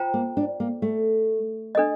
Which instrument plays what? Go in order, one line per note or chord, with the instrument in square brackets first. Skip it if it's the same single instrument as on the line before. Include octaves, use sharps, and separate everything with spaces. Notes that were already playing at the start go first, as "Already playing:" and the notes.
Already playing: [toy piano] F4 C5 G5 A#5
[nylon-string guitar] A#3
D4
A#3
A3
[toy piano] D4 A4 D#5